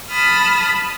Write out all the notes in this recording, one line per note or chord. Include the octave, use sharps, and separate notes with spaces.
A5 B5 D#6 F6